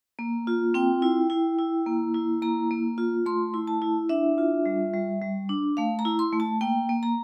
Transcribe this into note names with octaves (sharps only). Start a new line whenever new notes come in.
A#3
F4
C4 G5
E4
E4
E4
A#3
E4
A#3 A#5
A#3
F4
A3 C6
E4
A5
E4
D4 E5
F4
G3
G3
G3
D4
A3 F5
A#5
E4
C6
A3
A5
A#3 G5
A#3
A#5